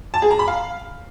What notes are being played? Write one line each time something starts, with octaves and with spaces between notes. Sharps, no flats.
A5
G#4
A#5
B5
F5